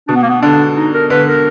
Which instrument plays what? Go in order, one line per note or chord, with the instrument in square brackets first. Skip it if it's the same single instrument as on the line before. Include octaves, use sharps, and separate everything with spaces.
[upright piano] B2 [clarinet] D4
[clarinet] B3
A#3
B3
[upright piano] D3 [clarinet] D4
[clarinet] D#4
A#4
[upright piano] D3 [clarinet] B4
[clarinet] A#4